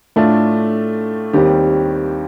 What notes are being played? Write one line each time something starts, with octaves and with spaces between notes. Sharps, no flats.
A2 A3 D4 F4
D#2 D#3 G3 C4 G4